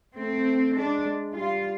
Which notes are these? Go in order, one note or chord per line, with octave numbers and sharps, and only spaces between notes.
A3 C4
G#3 D4
G#3
G3 F4